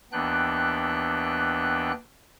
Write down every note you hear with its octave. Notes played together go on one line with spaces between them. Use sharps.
D#2 E3 B3 D4 G5 F#6